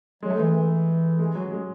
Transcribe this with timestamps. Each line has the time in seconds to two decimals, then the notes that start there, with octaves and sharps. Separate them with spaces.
0.23 F#3 G#3
0.30 A3
0.39 E3 G#3
0.55 E3
1.19 G#3
1.35 F#3
1.51 G#3